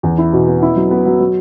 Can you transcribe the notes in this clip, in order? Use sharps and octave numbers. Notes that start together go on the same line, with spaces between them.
E2
E4
B2
B3
E4
F#3
B3
F#3
F#3